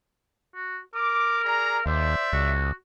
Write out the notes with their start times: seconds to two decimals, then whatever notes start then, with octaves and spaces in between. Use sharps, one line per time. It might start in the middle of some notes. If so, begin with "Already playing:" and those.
0.55 F#4
0.95 A#4 D6
1.44 G#4 D5 A#5
1.86 D#2 C5 D5 E5
2.33 C#2 F#4